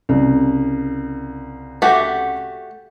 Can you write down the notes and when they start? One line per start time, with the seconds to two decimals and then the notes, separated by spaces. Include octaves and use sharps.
0.09 C2 C#3
1.82 A3 F#4 G4